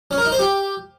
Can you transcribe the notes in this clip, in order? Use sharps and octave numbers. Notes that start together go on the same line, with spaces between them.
C#4
A#4
D#4
C5
G4